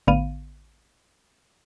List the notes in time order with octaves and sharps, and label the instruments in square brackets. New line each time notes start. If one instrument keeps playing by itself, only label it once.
[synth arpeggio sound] A1 D3 B3 F5 D#7